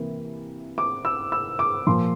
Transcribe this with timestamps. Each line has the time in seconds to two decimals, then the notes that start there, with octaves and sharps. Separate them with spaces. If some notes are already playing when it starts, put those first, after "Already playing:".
Already playing: C3 E3 A#3 E4
0.78 D6
1.05 E6
1.32 E6
1.59 D6
1.87 A#2 F3 C6